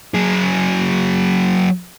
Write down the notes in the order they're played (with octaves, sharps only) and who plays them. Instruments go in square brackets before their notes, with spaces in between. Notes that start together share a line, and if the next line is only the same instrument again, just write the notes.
[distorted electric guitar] F#3 G#4